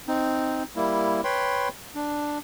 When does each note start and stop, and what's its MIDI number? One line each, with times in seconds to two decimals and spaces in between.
0.08 0.63 60
0.08 0.63 63
0.76 1.21 55
0.76 1.21 58
0.76 1.21 64
1.24 1.69 71
1.24 1.69 73
1.24 1.69 79
1.24 1.69 83
1.24 1.69 84
1.95 2.38 62